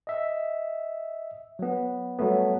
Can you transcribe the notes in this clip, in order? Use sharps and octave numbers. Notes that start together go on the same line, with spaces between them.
D#5 E5
F#3 B3
F#3 G3 A3 B3